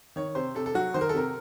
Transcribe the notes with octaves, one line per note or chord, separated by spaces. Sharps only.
D#3 C#5
C3 C5
C3 A4
A4
F#3 F#4
D#3 C5
A#4
A4
C3 A#4